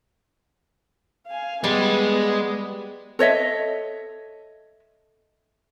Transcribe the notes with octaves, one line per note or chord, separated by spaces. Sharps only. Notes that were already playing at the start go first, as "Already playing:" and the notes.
F5 G#5
G3 G#3 B3
A4 C#5 D#5 E5